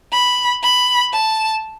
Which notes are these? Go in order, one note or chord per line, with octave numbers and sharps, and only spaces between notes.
B5
B5
A5